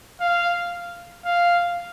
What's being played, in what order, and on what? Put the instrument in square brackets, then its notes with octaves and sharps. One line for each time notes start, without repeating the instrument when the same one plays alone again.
[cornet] F5
F5